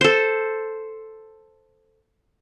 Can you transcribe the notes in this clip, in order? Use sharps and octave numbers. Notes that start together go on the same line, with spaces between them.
A4 C5